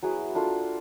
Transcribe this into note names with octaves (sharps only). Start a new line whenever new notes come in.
F#3 B3 E4 G#4
A#3 D4 F4 A4